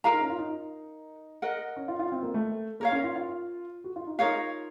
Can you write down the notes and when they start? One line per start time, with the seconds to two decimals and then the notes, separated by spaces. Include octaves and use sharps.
0.04 F4 A#4 F5 A#5
0.13 D#4
0.21 C#4
0.30 F4
0.39 D#4
1.42 A#4 D#5 F#5
1.76 C#4
1.88 F4
1.99 F4
2.12 C4
2.23 A#3
2.34 A3
2.80 A#3 A#4 C#5 F5
2.92 C#4
3.04 F4
3.16 F4
3.84 F#4
3.96 F4
4.07 D#4
4.18 D#4 F4 A#4 C#5 F5